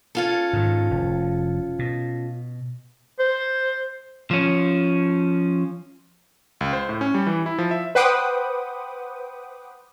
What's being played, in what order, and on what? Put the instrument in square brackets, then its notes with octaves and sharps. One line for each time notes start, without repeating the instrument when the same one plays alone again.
[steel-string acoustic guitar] C#4 F4 A4
[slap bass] G#2 D#3
F1
B2
[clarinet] C5
[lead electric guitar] F3 C#4
[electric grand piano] C#2
C5
A2
C#4
G3
E3
E4
F3
E5
[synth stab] B4 C5 F#5 G5 D6 D#6